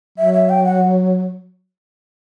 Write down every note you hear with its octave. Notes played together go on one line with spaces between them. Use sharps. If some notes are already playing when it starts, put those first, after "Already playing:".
F#3 E5
E5
G5
F#5